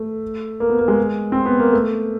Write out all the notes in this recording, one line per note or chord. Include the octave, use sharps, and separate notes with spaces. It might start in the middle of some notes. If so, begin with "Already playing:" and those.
Already playing: A3
A#3
B3
A#3
G#3
C4
B3
A#3
A3